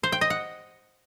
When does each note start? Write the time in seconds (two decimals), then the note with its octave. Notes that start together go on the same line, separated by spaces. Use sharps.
0.03 C5
0.12 G5
0.21 D#5
0.30 F#5